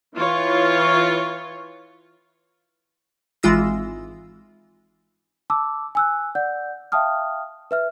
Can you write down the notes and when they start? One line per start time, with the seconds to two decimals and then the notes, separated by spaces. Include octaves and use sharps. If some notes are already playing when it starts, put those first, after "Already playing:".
0.16 E3 F4 C#5
3.43 G#1 E3 G#3 F4 E6 A#6
5.50 A5 D6 E6
5.95 G#5 E6 F#6
6.35 D5 F#5 G6
6.92 E5 F5 G5 A5 D#6 F6
7.71 B4 E5 F6